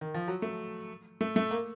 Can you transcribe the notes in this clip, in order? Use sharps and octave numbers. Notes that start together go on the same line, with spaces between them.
D#3
F3
F#3
A3
A3
A3
A#3